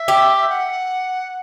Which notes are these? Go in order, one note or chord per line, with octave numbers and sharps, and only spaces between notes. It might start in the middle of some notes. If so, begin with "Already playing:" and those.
Already playing: E5
G4
F#5